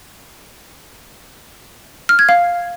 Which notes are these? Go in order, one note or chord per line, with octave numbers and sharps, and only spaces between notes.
F6
G#6
F5